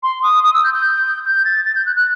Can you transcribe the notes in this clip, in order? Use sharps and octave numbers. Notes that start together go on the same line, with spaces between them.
C6
D#6
D#6
E6
G6
G6
G6
A6
A6
G6
F#6
F#6